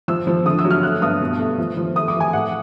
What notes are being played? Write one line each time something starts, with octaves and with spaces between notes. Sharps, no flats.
F3 E6
F3
D3 D#6
E6
F#3
F6
A3 F#6
G2 D#6
B2
A3
F3
F3
A3 D#6
D6
E3
G#5
A2 F#5